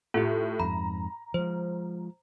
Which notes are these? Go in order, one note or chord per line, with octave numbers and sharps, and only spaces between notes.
A2 F4 G4
F2 G#2 A#5 B5
F3 G#3 C5